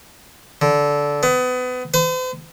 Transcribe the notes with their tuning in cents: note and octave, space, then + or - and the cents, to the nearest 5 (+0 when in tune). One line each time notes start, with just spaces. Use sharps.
D3 -15
B3 +30
C5 -45